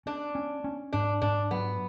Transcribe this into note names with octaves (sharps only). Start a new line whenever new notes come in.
C#4 D4
C#4
C#4
G#2 D4
G#2 D4
F#3 B3